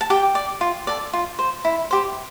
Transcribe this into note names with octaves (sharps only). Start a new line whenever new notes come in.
A5
G4 G5
D5
F4
A4 D5
F4
C5
E4
G4 C5